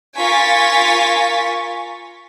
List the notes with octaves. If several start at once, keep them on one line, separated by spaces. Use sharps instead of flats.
F4 A#4 G#5 C#6 A6 B6